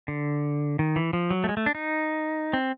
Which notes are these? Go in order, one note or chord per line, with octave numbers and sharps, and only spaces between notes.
D3
D#3
E3
F3
F#3
A3
G#3
A3
D4
D#4
C4